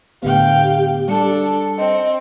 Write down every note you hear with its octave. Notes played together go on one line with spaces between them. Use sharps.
A2 D3 B3 G4 F5 G5
G3 D4 A4 C#7
C4 D#5